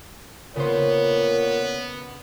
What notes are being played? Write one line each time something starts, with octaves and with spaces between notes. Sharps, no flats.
A#2 C#3 B3 C5 C#5